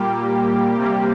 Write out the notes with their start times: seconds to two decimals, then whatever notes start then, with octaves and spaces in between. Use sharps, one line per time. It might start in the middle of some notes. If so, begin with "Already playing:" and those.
Already playing: A#2 G3 A#3 G4
0.77 C3 G3 A#3